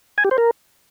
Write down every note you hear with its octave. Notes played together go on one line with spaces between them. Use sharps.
G#5
G4
C5
A#4